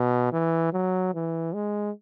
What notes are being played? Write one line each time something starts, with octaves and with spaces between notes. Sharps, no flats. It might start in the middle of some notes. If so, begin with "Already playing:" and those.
Already playing: B2
E3
F#3
E3
G#3